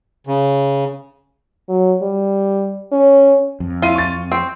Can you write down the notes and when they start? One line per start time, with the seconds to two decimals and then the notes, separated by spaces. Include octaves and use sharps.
0.27 C#3
1.69 F#3
2.02 G3
2.92 C#4
3.60 F2
3.82 E4 F4 D#7
3.95 C#6 A6
4.32 C4